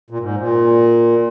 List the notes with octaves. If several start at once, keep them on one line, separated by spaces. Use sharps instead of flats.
A#2
G#2
A#2